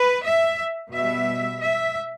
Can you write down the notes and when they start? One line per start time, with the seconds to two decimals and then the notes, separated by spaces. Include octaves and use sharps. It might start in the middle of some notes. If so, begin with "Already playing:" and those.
Already playing: B4
0.24 E5
0.92 B2 G3 E5
1.61 E5